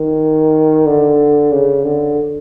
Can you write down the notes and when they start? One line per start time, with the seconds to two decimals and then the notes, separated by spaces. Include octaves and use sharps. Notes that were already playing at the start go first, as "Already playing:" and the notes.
Already playing: D#3
0.86 D3
1.52 C#3
1.84 D3